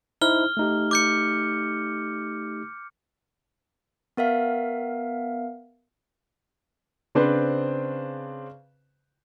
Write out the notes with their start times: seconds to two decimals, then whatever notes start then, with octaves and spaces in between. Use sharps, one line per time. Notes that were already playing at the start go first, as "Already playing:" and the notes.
0.21 D#4 E4 C5 F6 G7
0.57 A3 D#4 G4
0.91 D6 G6 C#7
4.17 B3 A#4 E5 F5
7.15 C#3 C4 D4 B4 C5